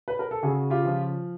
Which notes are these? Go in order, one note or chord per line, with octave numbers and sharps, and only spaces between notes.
B4
A#4
A4
C#3 F#4 G#4
F4 G4
F3